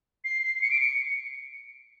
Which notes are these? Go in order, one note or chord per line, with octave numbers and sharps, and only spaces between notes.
C7
C7
C7
C#7
D7
C#7